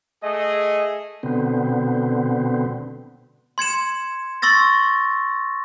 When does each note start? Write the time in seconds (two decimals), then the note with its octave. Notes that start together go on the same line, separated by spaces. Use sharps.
0.23 A3 G#4 D#5
1.23 B2 D3 B3 C4
3.58 C6 G#6 C#7 E7
4.42 C6 C#6 E6 A6 A#6